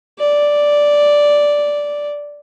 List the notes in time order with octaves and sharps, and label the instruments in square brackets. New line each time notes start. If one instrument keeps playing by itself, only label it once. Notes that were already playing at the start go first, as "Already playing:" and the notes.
[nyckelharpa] D5